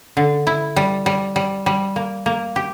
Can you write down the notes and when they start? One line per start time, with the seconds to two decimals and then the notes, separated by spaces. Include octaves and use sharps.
0.17 D3
0.47 E4
0.76 G3
1.06 G3
1.36 G3
1.66 G3
1.96 A#3
2.26 A#3
2.56 G4